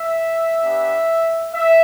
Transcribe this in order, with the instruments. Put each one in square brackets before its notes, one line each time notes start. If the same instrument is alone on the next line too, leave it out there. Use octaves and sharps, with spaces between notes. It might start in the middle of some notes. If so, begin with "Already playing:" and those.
Already playing: [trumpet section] E5
B3 D4 G4
E5